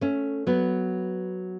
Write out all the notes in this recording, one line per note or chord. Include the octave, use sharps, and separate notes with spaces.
A3 C#4
F#3 B3